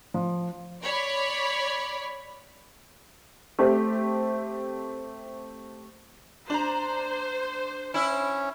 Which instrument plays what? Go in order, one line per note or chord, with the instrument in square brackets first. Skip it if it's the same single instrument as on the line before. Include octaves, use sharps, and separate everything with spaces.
[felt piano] F3
[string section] C#5 D5 B5
[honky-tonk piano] A3 C4 G4
[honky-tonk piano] D4 A#5 [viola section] C5
[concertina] C#4 [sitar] E4